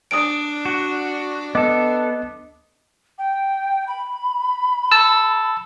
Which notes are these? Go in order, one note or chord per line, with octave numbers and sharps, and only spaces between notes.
D4 D#6 D7
F#4
B3 A4 D#5 D6
G5
B5
A5 E6